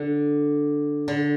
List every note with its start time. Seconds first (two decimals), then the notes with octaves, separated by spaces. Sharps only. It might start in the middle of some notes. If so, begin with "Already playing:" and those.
Already playing: D3
1.08 D3